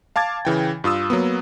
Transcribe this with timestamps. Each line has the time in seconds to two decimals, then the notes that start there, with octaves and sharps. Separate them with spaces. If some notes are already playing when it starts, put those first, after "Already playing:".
0.16 F5 A5 D6 G#6 A6
0.45 C#3 E3 G5
0.84 G2 F4 D#6 E6
1.10 F#3 A#3 B3